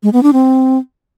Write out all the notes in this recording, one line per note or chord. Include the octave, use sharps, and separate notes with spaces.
G#3
B3
D4
C4